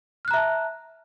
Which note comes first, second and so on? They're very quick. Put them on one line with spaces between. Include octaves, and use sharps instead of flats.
F6 F#6 A#5 E5 A5